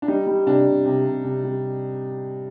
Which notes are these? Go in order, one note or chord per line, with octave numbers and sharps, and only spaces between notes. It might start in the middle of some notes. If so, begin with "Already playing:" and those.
D4
G3 D#4
G3
C3 D4
C3
C3
C3
C3
G3